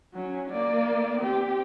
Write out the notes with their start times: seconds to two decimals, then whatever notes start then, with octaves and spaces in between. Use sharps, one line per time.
0.14 F#3 C#4
0.51 A#3 D5
1.19 C4 G4